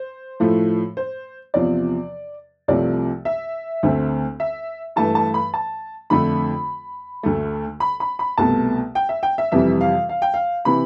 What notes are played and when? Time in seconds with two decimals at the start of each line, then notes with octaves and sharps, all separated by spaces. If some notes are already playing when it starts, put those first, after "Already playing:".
Already playing: C5
0.40 A2 F3 A3
0.97 C5
1.54 E2 C3 F3 D5
2.68 C2 C3 F3 A3 D5
3.25 E5
3.83 D2 D3 A3 C4
4.40 E5
4.96 G2 E3 A3 A5
5.15 A5
5.34 B5
5.54 A5
6.10 F2 D3 A3 D4 B5
7.23 D2 D3 A3
7.80 B5
8.00 B5
8.19 B5
8.38 C2 B2 A3 A5
8.95 G5
9.09 E5
9.23 G5
9.38 E5
9.52 F2 C3 E3 G3 E5
9.81 F5
10.09 F5
10.22 G5
10.34 F5
10.65 C3 E3 B5